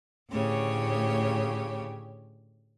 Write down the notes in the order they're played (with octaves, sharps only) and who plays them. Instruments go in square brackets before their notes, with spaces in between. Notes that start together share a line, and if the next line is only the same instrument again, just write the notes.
[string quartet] D2 A2 C#3 G4 C#5